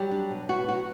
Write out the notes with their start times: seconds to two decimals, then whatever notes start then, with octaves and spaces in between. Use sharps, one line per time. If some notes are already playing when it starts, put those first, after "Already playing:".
Already playing: F#3 G3 G4
0.11 D4
0.30 B2
0.49 B3 F#4
0.68 F#3 F#4